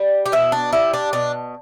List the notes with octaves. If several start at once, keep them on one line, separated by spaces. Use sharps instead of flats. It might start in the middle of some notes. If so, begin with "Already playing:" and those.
Already playing: G3
G4
B2 E4
D4
G3 E4
D4
B2 D4